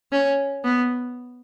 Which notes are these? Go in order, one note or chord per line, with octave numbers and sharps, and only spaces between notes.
C#4
B3